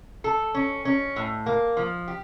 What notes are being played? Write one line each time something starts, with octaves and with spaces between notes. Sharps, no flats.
A4
C#4
C#4
A2
A#3
F3
G4